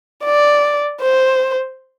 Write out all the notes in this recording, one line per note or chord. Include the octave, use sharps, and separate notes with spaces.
D5
C5